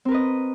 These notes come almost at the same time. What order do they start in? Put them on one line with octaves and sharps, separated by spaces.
C4 A#4 B4 D#5